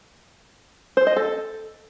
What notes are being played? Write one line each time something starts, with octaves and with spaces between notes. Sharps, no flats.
C5
D#5
A4